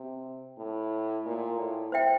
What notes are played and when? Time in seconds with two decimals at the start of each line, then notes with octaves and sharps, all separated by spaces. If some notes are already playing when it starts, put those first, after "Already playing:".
Already playing: C3
0.58 A2
1.25 A#2
1.59 A2
1.92 C5 E5 G5